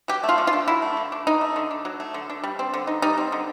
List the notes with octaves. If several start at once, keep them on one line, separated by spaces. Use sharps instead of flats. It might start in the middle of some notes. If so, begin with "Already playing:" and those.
F#3 G4
A3
F4
D3
F4
D4
F#3 E4
A3
D3
D4
F#3 D#4
A3
D3
D4
F#3
A3
D3
D4
G3
C4
D3
D#4
G3 D#4
C4
D3